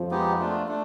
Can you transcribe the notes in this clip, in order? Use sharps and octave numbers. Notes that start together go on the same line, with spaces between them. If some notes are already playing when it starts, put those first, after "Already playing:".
Already playing: F2 F3
G#3 B3 D#4 G4
A3 D4 F4
A3 D4